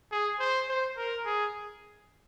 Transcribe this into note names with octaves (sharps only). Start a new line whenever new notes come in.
G#4
C5
C5
A#4
G#4